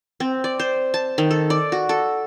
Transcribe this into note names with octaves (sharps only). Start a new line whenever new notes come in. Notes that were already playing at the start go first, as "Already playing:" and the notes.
C4
D5
C5
A5
D#3
A4
D5
F#4
A4